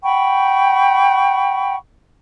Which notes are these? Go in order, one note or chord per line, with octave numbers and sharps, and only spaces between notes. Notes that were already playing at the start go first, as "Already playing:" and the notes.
F#5 G5 B5 C#6